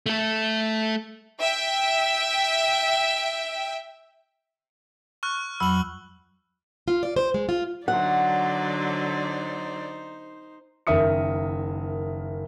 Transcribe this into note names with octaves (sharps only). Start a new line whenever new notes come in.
A3 A4
E5 G5
C#6 F6 F#6
F2 F#3 B5 E6 F#7
F4
D5
C5
G#3
F4
D3 F#3 D#4 C5 D5 F#5
F#1 D#3 A#4 E5 D#6 C#7